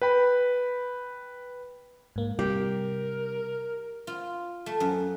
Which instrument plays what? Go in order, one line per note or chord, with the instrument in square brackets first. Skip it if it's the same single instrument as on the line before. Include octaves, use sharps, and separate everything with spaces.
[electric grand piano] B4 G5 B5
[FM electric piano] G#2 A#3
[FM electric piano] C3 G3 [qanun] G4 [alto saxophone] A#4
[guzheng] F4
A3
F#2